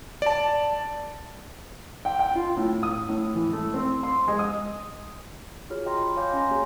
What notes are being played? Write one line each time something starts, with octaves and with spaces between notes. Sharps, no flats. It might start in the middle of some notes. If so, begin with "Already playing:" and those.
D5 A5
G5
G5
F4
A2
D#6
A2
E3
A3
C4
C6
G#3
D#6
F4 F#4 G#4 C#5 F6
D#5 G5 A#5 C6 A#6
B5
C#5 F5 G#5 C6 D6 G6
C#4 G#5 A#5 C6 A#6
A#3 F#4 G#4 C#5 A#5